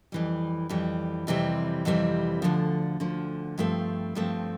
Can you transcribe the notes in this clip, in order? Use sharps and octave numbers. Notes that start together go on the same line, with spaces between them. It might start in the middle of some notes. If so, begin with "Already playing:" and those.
F2 E3 G3
F2 E3 G3
F2 C3 E3 G3 C4
F2 C3 E3 G3 C4
D2 D3 F3
D2 D3 F3
G2 F3 A3 C4
G2 F3 A3 C4